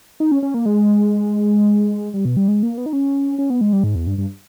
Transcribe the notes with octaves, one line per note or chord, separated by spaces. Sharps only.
D#4
C#4
C#4
A#3
G#3
G3
B2
G3
G#3
A#3
B3
D#4
C#4
C#4
B3
G#3
G3
G#2
E2
G2
G2